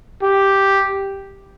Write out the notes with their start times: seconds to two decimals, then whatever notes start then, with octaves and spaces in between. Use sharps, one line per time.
0.23 G4